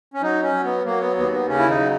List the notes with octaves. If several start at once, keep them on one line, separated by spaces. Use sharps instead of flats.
C#4
F#3 D#4
C#4
F#3
B3
F#3 A#3
B3
D#2 B3
B3
C#3 C#4
E4
D#4
F#3